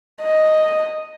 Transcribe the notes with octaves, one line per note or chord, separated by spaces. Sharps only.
D#5